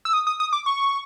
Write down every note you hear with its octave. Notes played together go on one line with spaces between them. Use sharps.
E6
D#6
D#6
D#6
D6
C#6